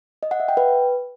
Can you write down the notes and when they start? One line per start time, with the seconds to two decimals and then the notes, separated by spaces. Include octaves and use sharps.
0.23 D#5
0.31 F#5
0.40 E5
0.48 G5
0.57 B4